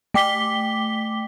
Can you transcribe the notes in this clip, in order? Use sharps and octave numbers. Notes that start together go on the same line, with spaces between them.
A3 G5 D6 B6 G7